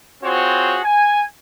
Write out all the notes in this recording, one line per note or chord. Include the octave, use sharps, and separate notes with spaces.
C4 F4 F#4 G#4 C5 C#5
G#5